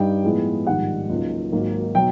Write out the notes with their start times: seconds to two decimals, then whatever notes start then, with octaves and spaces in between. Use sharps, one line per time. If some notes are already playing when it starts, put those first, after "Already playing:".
Already playing: G2 G3 D#4 G5
0.24 A2 F3 G#3 B3
0.66 A#1 G#2 D#3 G3 F#5
1.09 C#2 C#3 F#3 A#3 D#4
1.52 G#1 G#2 D#3 F#3 A#3
1.95 B2 F#3 G5